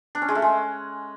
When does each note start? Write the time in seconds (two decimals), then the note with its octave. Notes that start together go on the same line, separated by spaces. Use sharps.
0.15 D4
0.22 C#4
0.28 G#3
0.35 A3
0.42 G#3